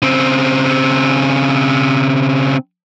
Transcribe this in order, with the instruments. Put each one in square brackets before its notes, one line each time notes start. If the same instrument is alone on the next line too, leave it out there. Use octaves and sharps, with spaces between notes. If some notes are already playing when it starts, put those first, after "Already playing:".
[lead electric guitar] C#3 C4